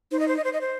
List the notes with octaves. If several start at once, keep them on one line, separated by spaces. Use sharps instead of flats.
D#4 C5
D#5
C5
D#5
C5
D#5
C5